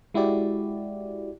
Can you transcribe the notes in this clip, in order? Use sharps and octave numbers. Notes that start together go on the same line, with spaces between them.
G#3 E4 F#4 G4 D5